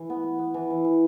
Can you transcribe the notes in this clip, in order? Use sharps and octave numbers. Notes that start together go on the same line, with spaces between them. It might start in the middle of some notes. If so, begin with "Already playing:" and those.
Already playing: E3
B3
B3
B3
E3
E3
E3